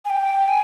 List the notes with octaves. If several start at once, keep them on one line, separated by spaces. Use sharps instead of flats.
G#5
G5
G#5